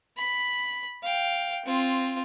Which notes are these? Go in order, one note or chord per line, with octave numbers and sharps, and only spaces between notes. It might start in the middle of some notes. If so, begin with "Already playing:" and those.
B5
F5 G5
C4 F4